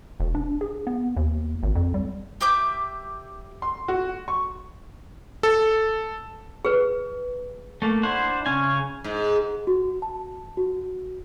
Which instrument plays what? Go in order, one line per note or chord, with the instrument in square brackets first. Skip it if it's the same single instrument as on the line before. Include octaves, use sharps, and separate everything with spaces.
[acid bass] E1
D4
G#4
B3
D#2
G#1
F2
G3
[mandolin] G4 E5 D6 G6
[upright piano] C6
F#4
C#6
[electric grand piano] A4
[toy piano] G#4 B4
[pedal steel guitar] A3 A#3
D4 E4 C5 F#5
C#3 C#4 G#5
[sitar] G#2
[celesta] F#4
A5
F#4